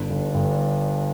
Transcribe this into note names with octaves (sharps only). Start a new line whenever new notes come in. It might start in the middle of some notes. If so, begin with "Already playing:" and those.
Already playing: G1 D4
G1
G1